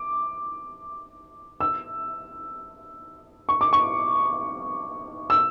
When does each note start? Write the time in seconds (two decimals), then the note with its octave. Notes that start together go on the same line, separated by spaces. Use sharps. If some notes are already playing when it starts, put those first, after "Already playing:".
Already playing: D6
1.60 E6
3.49 C#6
3.61 D6
3.73 C#6
5.30 E6